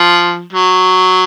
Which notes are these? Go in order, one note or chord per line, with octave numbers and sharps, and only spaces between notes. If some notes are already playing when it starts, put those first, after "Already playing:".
Already playing: F3
F#3